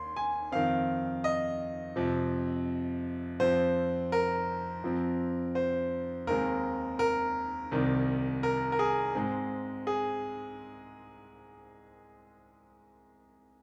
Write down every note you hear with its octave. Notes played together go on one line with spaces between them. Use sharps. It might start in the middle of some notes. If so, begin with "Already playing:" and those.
Already playing: D#2 C6
G#5
F2 D#3 C4 F5
D#5
F2 C3 F3
F2 F3 C4 C5
A#4
F2 F3 C4
C5
D#2 D#3 G#3 C4 A#4
A#4
C2 C3 D#3
A#4
A#4
G#4
G#2 G#3 C4
G#4